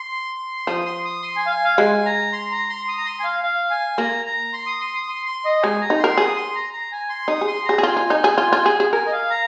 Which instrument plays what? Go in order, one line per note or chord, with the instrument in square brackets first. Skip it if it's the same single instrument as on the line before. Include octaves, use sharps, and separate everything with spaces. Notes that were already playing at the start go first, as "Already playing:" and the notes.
Already playing: [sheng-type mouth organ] C6
[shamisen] F3 [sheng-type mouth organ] D#6
[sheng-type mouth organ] C6
D#6
C6
G#5
F5
G#5
F5
[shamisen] G#3 [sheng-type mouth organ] G#5
[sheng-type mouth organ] A#5
C6
A#5
C6
D#6
A#5
C6
G#5
F5
F5
G#5
[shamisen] A#3 [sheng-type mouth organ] A#5
[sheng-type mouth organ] A#5
C6
D#6
C6
D#6
C6
C6
D#5
[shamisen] G#3 [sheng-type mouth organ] G#5
[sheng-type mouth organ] A#5
[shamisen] D#4
[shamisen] A#4 [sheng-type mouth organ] C6
[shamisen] G#4 [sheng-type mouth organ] D#6
[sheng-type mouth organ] C6
A#5
A#5
G#5
C6
[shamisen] D#4 [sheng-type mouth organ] D#6
[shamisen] G#4
[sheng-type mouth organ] C6
[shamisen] G#4 [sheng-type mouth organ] A#5
[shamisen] G#4
[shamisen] F4 [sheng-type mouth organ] G#5
[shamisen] F4
D#4
G#4
F4
F4
G#4
G#4
[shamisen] A#4 [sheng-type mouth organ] G#5
[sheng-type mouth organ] D#5
F5
A#5